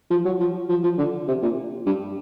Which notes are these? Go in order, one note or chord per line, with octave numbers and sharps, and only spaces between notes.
F3
F#3
F3
F3
F3
D3
C3
A#2
G2